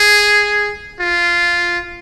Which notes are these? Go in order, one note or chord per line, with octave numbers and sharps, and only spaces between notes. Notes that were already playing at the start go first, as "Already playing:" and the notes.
Already playing: G#4
F4